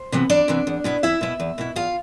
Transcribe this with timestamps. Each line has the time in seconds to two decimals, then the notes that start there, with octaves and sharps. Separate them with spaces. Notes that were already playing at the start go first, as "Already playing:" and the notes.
Already playing: C5
0.12 C3 E3 B3
0.30 E2 D4 D5
0.48 C3 E3 B3
0.67 E2
0.84 B2 B3 E4
1.03 E2 E4 E5
1.21 B2 B3 E4
1.40 E2
1.58 B2 B3 E4
1.76 E2 F4 F5